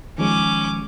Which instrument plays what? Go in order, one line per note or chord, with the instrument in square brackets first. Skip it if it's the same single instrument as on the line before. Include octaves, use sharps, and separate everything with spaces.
[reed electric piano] D#3 F3 G#3 [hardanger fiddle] C#4 D6